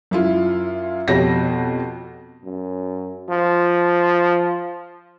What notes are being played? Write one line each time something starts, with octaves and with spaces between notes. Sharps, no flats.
F#2 E4 F4
F2 B2 F#4 G4 C#5 A#6
F#2
F3